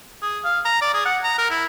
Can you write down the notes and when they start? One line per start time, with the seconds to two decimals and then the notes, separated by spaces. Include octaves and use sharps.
0.22 G#4
0.45 F5
0.65 A#5
0.81 D5
0.94 G#4
1.05 F#5
1.23 A#5
1.38 A#4
1.50 E4